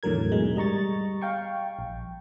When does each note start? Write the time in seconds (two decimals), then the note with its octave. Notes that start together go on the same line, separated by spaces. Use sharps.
0.03 E2 A2 D3 F#3 A#4 G#6
0.32 G#2 B2 G#3
0.56 G3 D#5 A#5 C#6 A6
1.22 F5 G5 C#6
1.79 A#1